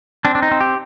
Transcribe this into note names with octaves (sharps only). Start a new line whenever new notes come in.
C4 D4
D4
D#4
C4
G4